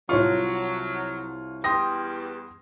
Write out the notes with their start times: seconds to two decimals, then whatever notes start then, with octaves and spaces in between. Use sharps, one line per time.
0.09 C2 F#3 F4 C#5 C#6
1.64 E2 G3 G5 C6 D#6 A#6